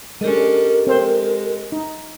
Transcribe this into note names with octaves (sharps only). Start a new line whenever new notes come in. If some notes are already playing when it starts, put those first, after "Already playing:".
G#3 C#4 D4 G4 A4 A#4 D#5
G#3 C4 C5
D#4